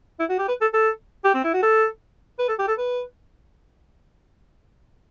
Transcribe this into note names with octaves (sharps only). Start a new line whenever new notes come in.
E4
F#4
G4
B4
A4
A4
G4
C4
E4
F#4
A4
B4
A4
G4
A4
B4